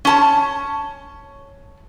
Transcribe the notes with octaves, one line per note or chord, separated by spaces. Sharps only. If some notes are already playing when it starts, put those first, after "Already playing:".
C#4 A5